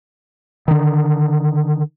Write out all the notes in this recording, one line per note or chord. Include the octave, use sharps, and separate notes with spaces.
D3 D#3